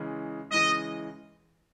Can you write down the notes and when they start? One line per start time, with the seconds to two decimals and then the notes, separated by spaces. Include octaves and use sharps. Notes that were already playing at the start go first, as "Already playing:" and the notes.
Already playing: C#3 E3 G#3
0.52 C#3 E3 G#3 D#5